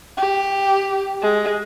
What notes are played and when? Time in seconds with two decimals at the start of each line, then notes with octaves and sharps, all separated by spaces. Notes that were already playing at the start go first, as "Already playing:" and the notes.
0.17 G4
1.22 G#3